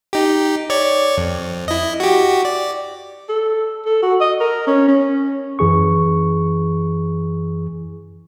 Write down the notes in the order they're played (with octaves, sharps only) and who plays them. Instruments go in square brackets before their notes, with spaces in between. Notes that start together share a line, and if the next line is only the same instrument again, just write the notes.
[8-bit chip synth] D#4 G4
C#5 D5 C#6
F2
E4 D#5
F#4 G4
D5
[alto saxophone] A4
A4
F#4
D#5
A#4
C#4
C#4
[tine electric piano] F#2 E3 G#4 C#6